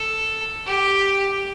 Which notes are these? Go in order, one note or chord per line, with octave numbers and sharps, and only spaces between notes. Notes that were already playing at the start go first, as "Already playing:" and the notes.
Already playing: A4
G4